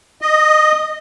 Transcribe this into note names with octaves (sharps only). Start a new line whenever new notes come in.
D#5